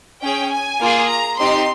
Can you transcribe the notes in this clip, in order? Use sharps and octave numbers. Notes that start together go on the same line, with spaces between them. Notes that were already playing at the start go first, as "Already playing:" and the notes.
C#4 G#4 G5
G#5
A#3 F4 G#4
A#5
C4 D#4 G4 C6